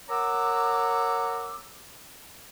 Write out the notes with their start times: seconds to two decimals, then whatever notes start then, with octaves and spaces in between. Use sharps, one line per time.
0.09 A#4 C#5 F#5 A#5 D6 E6